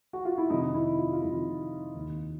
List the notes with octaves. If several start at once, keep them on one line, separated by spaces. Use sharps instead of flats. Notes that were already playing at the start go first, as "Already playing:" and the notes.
F#4
F4
E4
F2 C3 D#3 D#4
E4
F4
F4
F2 C3 D#3 E4
D#2 D#3